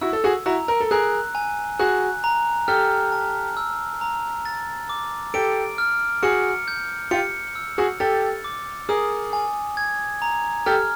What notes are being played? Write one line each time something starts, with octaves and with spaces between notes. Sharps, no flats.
E4 F#4 E6
A4
F#4 G#4
E4 F#4 A#5
A#4
A4
G#4 A#4 F#6
G#5
F#4 G#4 F#6
A#5
G4 A4 F6
A5
E6
A#5
A6
D6
G4 A4 D7
F6
F#4 G#4 C#7
G6
F4 G4 C#7
E6
F#4 G#4
G4 A4 A6
D6
G#4 A#4 D#6
G#5
G#6
A#5
G4 A4 F6